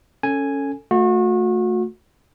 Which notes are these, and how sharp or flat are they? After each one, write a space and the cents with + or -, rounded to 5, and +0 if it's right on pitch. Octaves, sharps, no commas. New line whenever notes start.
C#4 +0 A4 +15 G#5 +0
A3 +5 F#4 -35